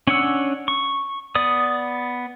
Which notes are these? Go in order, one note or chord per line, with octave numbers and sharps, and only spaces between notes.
C#4 D4 C#5 F#5 E6
C#6
B3 D5 D#6